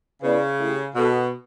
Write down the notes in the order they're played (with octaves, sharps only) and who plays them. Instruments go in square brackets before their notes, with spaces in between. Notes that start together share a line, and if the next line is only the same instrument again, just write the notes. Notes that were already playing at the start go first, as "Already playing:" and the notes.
[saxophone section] C#3 [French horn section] B3 E4 B4 D5
[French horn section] A3 C#4 E4 G4
[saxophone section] B2 [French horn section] B3 F#4 A4